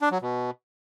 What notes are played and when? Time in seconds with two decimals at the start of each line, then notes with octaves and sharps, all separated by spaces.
0.01 D4
0.11 F#3
0.22 B2